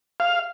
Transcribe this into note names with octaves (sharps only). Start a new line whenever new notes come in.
F5